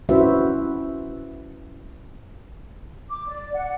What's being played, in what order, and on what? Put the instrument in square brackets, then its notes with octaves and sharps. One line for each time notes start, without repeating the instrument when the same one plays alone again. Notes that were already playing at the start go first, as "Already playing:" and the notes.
[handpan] C#4 E4 F#4 B4 C5 E5
[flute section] D6
D5
F#5